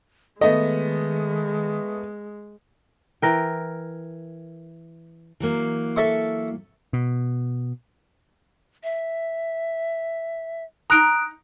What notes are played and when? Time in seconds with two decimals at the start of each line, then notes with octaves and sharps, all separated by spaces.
0.41 D#3 G#3 A3 B3 D#5
3.22 E3 A#4 G5
5.40 E3 F#3 A#3
5.96 A4 E5 C#6
6.93 B2
8.83 E5
10.90 D#4 A#5 D#6 F#6 D7